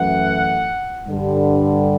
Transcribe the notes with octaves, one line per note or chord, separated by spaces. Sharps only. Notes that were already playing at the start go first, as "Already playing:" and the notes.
Already playing: F#2 E3 A3 F#5
G2 D3 G3